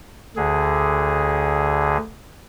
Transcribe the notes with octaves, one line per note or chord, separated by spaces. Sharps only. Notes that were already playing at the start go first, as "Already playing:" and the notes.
D2 D3 G#4